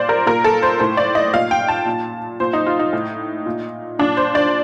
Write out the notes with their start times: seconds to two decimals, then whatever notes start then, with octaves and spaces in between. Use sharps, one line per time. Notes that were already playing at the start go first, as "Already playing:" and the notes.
Already playing: A#2 C5 D5
0.09 A#4
0.26 A#2 A#4
0.44 A4
0.62 C5
0.80 A2 C5
0.97 D5
1.15 D#5
1.33 A#2 F5
1.51 G5
1.68 A5
1.86 A#2
2.40 A#2 C5
2.53 D#4
2.67 F4
2.79 D#4
2.93 A2
3.46 A#2
3.99 A#2 D4
4.17 C5
4.35 D5